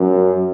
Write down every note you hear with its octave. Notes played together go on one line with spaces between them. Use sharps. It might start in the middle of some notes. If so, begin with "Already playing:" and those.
Already playing: F#2